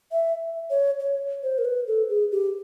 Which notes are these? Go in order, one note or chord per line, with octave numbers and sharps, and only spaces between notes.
E5
C#5
C#5
C5
A#4
B4
A4
G#4
G4